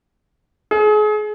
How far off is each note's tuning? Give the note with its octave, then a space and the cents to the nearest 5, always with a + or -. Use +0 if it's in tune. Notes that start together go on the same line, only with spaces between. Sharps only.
G#4 +35